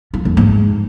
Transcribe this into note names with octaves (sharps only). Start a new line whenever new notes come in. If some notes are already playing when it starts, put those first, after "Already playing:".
F3
F2
G#2